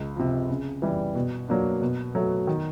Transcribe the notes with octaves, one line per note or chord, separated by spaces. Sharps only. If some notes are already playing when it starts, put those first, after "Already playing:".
Already playing: C#2
C3 F3
C#3
E3 G3
B2
F#3 A#3 D4
B2
F#3 A3
D#3